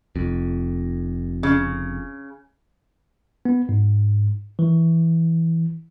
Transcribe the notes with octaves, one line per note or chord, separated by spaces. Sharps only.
F1 F2
C#3
B3
G#2
E3